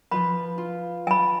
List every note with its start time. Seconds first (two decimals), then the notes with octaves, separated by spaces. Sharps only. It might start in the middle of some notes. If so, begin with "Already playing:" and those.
0.12 F3 F4 B4 B5
0.58 F4
1.07 G#5 A5 B5